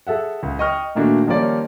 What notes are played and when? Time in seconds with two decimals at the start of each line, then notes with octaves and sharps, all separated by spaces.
0.07 G#4 A4 E5 F#5
0.43 C#2
0.59 D#5 G5 C#6 D#6 F6
0.95 A#2 D#3 A3 A#3 D4 F#4
1.27 D#3 F3 G3 A#3 C#4 D5